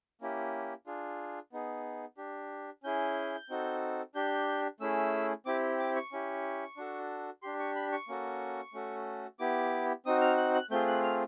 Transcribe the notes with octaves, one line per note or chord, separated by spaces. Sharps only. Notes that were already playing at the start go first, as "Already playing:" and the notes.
A#3 C#4 E4 G4
D4 F4 G#4
B3 D#4 G#4
D4 G4
C#4 E4 G#4 G6
C4 D#4 F#4 A4
D4 G4 G6
A3 C#4 E4 G#4 E6
C4 E4 G4 D6
D6
C#6
C#4 E4 G4
D4 F#4 A4
D4 G4 C6
C#6
B5
C#6
A#3 C#4 F#4 A4
A3 C#4 F#4 A4
B3 E4 G4 D6
C4 D#4 F#4 D#6
F6
F#6
F#6
A3 C4 F4 G#4 G6
F#6
F6